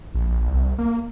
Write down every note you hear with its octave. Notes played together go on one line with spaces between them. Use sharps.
A#1
C2
A#3